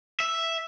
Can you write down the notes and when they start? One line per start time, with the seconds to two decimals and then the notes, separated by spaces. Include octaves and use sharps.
0.20 E5